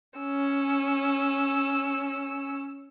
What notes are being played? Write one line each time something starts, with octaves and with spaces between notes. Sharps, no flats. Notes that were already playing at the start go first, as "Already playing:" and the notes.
C#4 E6